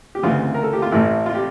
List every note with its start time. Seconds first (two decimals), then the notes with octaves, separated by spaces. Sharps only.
0.15 G4
0.23 D2 C#3 E3 F4
0.54 A#4
0.63 A4
0.73 G4
0.82 F4
0.91 A1 A2 E3 E4
1.26 F4
1.35 G4